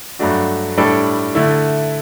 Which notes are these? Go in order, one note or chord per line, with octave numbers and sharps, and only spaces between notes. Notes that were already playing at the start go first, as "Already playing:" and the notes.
G2 F#3 A3 D4 F#4
A2 G3 D4 A4
D3 A3 E4